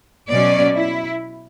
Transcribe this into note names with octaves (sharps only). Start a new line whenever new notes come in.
B2 F#3 C#4 D5
E4